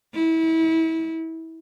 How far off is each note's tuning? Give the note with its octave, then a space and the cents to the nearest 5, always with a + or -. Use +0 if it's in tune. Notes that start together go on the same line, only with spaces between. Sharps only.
E4 -30